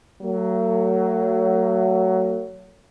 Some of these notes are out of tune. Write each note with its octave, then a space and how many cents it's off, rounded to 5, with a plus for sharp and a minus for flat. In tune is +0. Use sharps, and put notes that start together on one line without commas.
F#3 +20 A3 +45